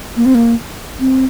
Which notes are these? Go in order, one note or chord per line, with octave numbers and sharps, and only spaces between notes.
A#3
C4
A#3
C4